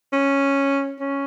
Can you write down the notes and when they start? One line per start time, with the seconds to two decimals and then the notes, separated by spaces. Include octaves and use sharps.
0.13 C#4
1.00 C#4